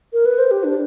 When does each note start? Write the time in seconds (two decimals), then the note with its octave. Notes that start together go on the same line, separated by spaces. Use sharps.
0.13 A#4
0.26 B4
0.39 C5
0.51 G4
0.64 D4